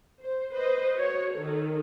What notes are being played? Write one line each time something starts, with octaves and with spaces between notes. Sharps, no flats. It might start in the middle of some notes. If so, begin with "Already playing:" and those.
C5
B4 C5 D#5
F#4 C#5
D#3 A4